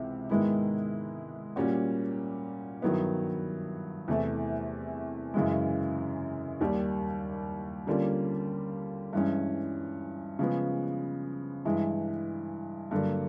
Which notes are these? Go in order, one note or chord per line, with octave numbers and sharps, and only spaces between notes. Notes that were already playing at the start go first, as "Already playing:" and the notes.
Already playing: C#2 C3 E3
G#2 D#3 G#3 B3 E4
A#2 G3 A#3 C#4 F#4
G2 D#3 F#3 B3 E4
E2 C3 E3 A3
F#2 C#3 E3 G#3
D#2 D#3 G3
D3 G3 A#3 C#4 F4
G2 E3 G#3 C#4
C#3 F3 G#3 B3
G2 E3 G#3
G2 D3 F#3 A#3